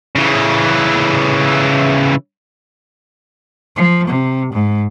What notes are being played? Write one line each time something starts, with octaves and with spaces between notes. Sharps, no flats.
C#3 E3
F3
C3
G#2